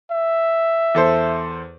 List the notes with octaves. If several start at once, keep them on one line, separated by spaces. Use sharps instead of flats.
E5
E2 A4 C5